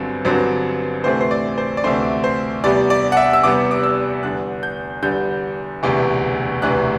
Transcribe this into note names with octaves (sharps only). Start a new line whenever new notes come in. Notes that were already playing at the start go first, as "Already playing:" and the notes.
Already playing: G1 G2 D3 F#3 C4
G1 G2 D3 F#3 C4
D2 C3 E3 A3 C4 C5
C5
D5
C5
D5
D2 C3 E3 A3 C4 C5
C5
E2 C3 G3 B3 D5
D5
F#5
E5
E6
E2 C3 G3 B3 D6
D6
E6
E2 D3 G3 F#6
G6
E2 D3 G3 G6
E1 D2 C3 E3
E1 D2 C3 E3 F#6